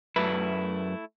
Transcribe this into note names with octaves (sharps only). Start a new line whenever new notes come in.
F#2 A3 E4 B4